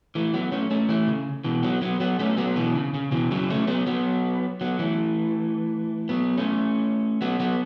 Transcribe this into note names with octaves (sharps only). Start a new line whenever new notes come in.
E3 A3
F#3 B3
A3 C#4
A3 C#4
E3 A3
C#3
B2 E3
F#3 B3
F#3 B3
F#3 B3
A3 C#4
F#3 B3
B2 E3
C#3
C#3
B2 E3
C#3 F#3
A3 C#4
F#3 B3
F#3 B3
F#3 B3
E3 A3
F#3 B3
A3 C#4
F#3 B3
F#3 B3